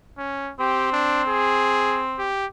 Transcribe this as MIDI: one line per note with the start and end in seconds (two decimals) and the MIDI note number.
0.18 0.52 61
0.60 2.28 60
0.60 0.90 67
0.92 1.23 62
1.28 2.04 68
2.19 2.46 67